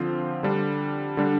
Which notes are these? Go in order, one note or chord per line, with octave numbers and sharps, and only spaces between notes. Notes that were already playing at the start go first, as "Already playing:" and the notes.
Already playing: D3 F3 C4 F4 C5
D3 G3 D4
D3 G3 D4